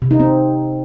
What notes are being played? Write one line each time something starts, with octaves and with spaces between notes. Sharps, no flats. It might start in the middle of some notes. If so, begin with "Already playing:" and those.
C3
D#4
C4